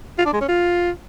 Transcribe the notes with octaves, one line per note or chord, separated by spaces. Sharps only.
F4
D4
G#3
C#4
F4